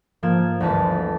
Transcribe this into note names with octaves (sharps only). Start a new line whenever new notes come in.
G#2 F3 A#3 F4 G#6 E7
G1 D2 E3 G#3 A5 B6